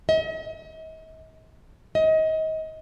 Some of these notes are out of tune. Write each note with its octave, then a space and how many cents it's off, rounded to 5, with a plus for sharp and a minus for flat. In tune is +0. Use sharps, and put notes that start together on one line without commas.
D#5 +45
D#5 +30